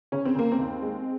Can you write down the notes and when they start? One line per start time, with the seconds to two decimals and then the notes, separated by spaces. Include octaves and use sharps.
0.12 C#3 C#4
0.25 C4
0.35 C#3 A#3
0.52 C4
0.59 D#2
0.82 G#3